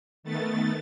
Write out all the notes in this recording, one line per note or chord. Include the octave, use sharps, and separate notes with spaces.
D#3 A3 B3 A6